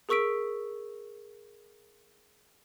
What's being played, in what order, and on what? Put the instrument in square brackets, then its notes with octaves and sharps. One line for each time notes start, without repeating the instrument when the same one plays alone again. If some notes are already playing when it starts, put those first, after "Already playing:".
[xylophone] G#4 A#4 C#6 E6 B6 D7